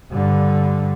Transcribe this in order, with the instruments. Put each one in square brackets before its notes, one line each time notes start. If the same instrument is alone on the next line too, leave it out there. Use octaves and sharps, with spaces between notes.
[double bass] G2 D3